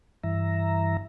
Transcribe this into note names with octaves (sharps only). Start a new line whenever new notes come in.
G2 E3 E5 A#5